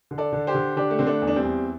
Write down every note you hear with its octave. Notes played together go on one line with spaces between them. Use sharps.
D3
A4 D5
D3
G4 C5
D3
D3 D4 G4
A3
D3 C4
A3 D4
E2
D4
G3 C4
E2